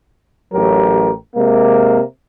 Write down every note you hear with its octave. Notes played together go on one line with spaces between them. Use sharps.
A1 F#3 G4 A#4
C3 G#3 A#3